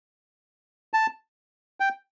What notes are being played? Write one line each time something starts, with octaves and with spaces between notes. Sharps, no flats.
A5
G5